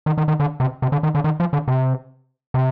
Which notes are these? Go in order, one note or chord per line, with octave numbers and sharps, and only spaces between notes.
D#3
D#3
D#3
D3
C3
C3
D3
D#3
D3
D#3
F3
D3
C3
C3